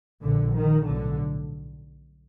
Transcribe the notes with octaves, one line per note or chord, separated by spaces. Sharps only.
A#1 A#2 D3
D#3
B1 A2 D3